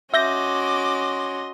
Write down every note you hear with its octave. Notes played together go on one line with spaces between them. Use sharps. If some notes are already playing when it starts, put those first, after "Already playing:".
C#4 F#4 D#5 E5 C6 D6 G6 A#6